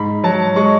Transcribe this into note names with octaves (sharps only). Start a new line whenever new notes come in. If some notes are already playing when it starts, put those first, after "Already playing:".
Already playing: G#2 B5
F#3 A5
G#3 C#6